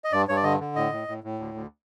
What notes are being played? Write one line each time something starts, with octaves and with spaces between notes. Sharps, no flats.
D#5
G2 D5
G2 C#5
D5
D3 D#5
D3
A2 D#5
A2
A2
A2
D2
D2